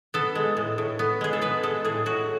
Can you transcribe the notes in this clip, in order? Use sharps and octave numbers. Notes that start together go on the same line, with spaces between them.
B3 A4
G#3
A2
A2
B3
G#3 G#4
A4
B3 B4
G#3 A4
A2 G#4
A2 F#4